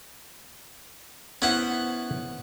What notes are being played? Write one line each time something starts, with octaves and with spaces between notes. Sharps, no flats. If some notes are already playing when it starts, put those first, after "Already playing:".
B3 C#4 E4 C5 F#5